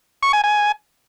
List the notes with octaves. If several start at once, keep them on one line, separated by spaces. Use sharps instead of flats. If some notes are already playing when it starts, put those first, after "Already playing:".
C#6
G#5
G#5